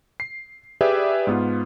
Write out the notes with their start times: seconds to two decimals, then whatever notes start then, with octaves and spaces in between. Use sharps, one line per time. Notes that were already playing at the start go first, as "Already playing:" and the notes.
0.20 C7
0.81 G4 G#4 B4 D5 E5
1.27 G#2 B3 F4